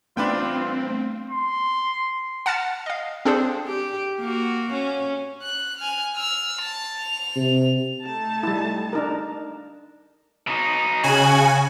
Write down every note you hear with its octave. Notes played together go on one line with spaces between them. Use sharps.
A3 B3 C4 D4 F4 B4 G5
C6
F#5 A5 F6 A6 C#7
D#5 F5
C4 D4 G#4 A4 C5
G4
A#3 F#4
C#4
F#6
G#5 F6
E6 F6
A5
F7
C3
A3 D#4 A5
G3 E4
D4 D#4 A#4
B2 D#4
C#3 F#4 G#5